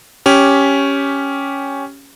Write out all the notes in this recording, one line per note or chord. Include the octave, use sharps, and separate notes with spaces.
C#4 G4